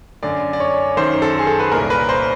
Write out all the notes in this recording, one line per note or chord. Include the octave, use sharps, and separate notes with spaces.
F#2 D3 D5
D5
C#5
F#2 D#3 C5
A4
G#4
A4
B4
C2 A#2 A#4
B4
C5